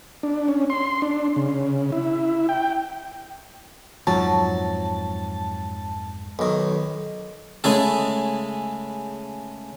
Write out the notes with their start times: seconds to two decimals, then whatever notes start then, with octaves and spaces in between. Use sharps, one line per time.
0.23 D4
0.48 C#4
0.70 C6
1.02 D4
1.36 C#3
1.92 E4
2.49 G5
4.07 F2 G#2 F3 F#3 A5
6.39 B1 D#3
7.64 C#3 G#3 A3 E4 G#4